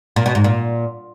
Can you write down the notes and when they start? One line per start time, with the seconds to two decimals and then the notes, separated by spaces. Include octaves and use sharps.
0.16 A#2
0.26 B2
0.35 G#2
0.44 A#2